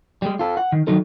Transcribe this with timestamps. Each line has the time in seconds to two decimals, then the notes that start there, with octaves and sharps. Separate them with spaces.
0.22 G3 G#3
0.39 F4 A4
0.57 F#5
0.72 D#3
0.87 D#3 F#3 D#4 A4